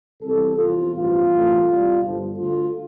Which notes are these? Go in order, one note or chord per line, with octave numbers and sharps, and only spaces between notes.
C2 C3 E3 B3 A4
E2 C3 F3 F4
A1 G2 F3 B3 F4
A1 G2 E3 A3 C4
C2 B2 G3
G1 G2 D3 F3
D2 D3 A3 F4